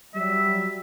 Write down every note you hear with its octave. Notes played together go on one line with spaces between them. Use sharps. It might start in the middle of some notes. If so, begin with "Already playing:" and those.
F#3 G3 E5